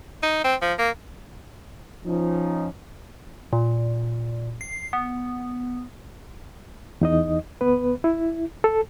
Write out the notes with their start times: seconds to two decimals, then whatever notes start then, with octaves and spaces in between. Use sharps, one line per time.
0.23 D#4
0.44 C4
0.62 F3
0.79 A#3
2.06 F3 C#4 D#4
3.53 A#2
4.61 C7
4.93 B3
7.01 E2 D#4 D#5
7.61 D2 B3 B4
8.04 E4
8.64 A4